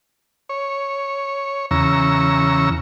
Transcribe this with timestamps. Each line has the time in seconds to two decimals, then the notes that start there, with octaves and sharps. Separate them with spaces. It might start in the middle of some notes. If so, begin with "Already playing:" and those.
0.49 C#5
1.71 E2 C#3 A#5 C#6 E6